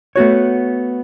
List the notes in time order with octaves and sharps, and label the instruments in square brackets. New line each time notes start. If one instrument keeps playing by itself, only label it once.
[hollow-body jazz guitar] A3 B3 F#4 C#5